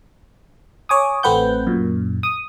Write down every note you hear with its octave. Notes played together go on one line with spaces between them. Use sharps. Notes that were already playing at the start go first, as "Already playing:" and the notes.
C#5 G#5 D6 D#6
A1 A3 C4 B4 F#5 G6
F#2 A#2
D#6